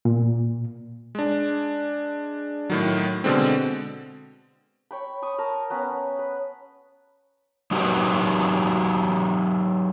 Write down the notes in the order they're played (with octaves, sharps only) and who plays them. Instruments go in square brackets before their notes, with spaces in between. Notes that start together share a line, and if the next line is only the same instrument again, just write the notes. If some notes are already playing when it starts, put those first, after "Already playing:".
[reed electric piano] A#2
[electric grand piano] G#3 D4
A2 D#3 F#3
B2 D3 G#3 C4
[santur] C#5 G5 B5
C#6 D#6
A#4 A5
B3 C#4 B4 A#5
B4
[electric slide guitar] F#3 D#4 F#4 G4 A#4 B4